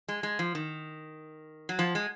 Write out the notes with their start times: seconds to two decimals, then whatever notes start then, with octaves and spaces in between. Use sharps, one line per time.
0.08 G#3
0.23 G#3
0.39 F3
0.55 D#3
1.69 F#3
1.79 F3
1.95 G#3